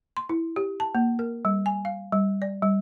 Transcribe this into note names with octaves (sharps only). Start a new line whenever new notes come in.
C6
E4
G4
A5
A#3
A#4
G3
G#5
F5
G3
D5
G3